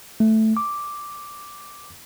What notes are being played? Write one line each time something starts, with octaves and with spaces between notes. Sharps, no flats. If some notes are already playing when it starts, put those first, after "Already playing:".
A3
D6